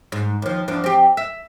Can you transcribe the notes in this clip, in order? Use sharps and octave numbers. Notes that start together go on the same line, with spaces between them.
G#2
D#2 F3
E2 F3 D4
C4 G4
E5